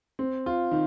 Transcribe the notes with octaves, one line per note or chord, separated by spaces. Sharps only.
C4
F4
D#3